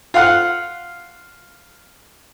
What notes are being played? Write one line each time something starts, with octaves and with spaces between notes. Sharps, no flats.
F4 F5 F#5